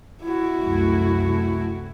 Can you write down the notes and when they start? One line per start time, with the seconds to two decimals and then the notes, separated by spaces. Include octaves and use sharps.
0.22 E4 F#4
0.59 C2 F#2 A3